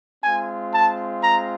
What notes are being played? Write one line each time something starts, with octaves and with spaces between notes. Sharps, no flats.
G#3 C4 F4 G#5
A5
A#5